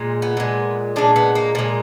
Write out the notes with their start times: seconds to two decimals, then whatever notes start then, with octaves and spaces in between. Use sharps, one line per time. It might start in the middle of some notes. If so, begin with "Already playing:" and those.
Already playing: A#2 G#3
0.22 B3
0.37 A#2 G#3
0.96 A#2 G#3 D4
1.16 B3
1.35 A#3
1.55 A#2 G#3